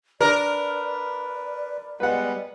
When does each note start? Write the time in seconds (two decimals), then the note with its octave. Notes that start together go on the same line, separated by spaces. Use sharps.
0.21 D4 A#4 B4 D5
2.00 G3 G#3 B3 B4 F#5